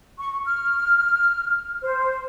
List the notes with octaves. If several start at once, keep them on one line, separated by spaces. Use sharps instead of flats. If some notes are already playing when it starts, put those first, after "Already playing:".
C#6
F6
C5